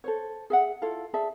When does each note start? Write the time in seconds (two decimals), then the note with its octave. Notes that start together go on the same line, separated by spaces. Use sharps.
0.04 A4 C5 C#5
0.50 G#4 E5 F#5
0.82 E4 F4 A4 F5
1.14 G#4 D5 E5 A5